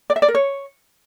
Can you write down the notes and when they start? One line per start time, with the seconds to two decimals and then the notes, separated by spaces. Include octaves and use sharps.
0.10 D5
0.16 E5
0.22 D5
0.28 A#4
0.35 C#5